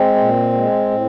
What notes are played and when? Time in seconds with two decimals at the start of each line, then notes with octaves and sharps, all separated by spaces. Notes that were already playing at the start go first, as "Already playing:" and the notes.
Already playing: G#3 C4
0.16 A#2
0.53 G#3
0.91 A2